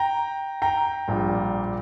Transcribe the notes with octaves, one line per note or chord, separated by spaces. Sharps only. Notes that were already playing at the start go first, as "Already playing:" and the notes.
Already playing: G5 A#5
G5 A#5
A#1 A#2 G3